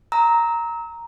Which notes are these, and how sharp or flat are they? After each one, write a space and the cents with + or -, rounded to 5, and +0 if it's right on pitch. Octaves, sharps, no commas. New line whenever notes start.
A#5 +0 E6 -40